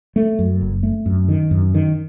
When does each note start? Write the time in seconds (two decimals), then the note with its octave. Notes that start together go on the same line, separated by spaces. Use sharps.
0.16 A3
0.39 F#2
0.61 F#1
0.83 A3
1.06 F#2
1.28 D#3
1.51 F#2
1.74 D#3